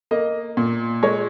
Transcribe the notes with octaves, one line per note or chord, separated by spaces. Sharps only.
A#3 D#5
A#2
G#3 C#5